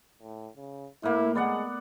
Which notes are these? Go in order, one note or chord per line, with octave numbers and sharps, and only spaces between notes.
A2
C#3
A2 A#3 E4
G#3 B3 D5 F#5